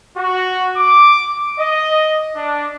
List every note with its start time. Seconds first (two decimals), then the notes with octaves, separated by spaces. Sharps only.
0.17 F#4
0.77 D6
1.59 D#5
2.36 D4